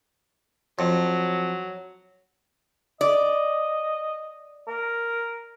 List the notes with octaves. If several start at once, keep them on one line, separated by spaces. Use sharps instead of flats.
F2 F#3
D5 D#5
A#4